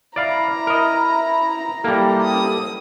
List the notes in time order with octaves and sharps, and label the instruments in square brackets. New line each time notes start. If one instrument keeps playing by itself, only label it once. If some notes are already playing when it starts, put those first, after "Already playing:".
[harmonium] E4 [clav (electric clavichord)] D5 F5 [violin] A#5
[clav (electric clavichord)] A#4 D#5
[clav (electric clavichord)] G3 A#3 [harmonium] E4 G4 A4
[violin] D#6